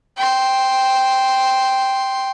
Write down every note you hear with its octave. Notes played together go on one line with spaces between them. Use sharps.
G5 C6